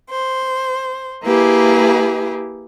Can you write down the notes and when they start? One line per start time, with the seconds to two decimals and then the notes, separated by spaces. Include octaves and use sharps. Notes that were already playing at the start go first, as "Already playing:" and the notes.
0.11 C5
1.25 A#3 E4 G4 G#4 B4